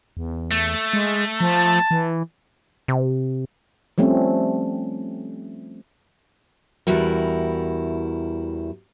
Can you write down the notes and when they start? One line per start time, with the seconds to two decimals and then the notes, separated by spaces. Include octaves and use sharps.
0.17 E2
0.51 A3
0.93 G#3
1.41 F3 A5
1.91 E3
2.88 C3
3.98 F3 G3 A3 C4 C#4
6.87 E2 G3 E4 F#4 A#4